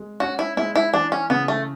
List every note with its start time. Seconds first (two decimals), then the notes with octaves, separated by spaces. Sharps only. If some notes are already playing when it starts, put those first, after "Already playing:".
Already playing: G#3
0.20 C#4 F#4
0.39 E4
0.57 G#3 E4
0.75 E4
0.93 E3 D4
1.12 C#4
1.30 C#3 B3
1.48 A3